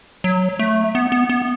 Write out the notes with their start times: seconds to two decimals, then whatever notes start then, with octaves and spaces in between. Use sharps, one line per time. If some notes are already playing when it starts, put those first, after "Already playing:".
0.24 F#3
0.59 A3
0.95 B3
1.12 B3
1.29 B3